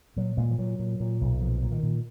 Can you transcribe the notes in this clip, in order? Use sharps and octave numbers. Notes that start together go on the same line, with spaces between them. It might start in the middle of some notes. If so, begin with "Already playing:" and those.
A#2 F#3
A#2 G#3
F3
A#2 F#3
A#2
A#2
B1
A#2 F3
A#2
D#3
A#2